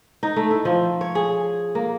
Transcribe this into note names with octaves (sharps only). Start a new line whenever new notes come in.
D#4
A3
E4
F3
C#5
G#4
A#3